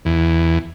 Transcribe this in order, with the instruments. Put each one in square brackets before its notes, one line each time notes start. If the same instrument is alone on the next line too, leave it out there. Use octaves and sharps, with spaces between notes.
[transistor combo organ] E2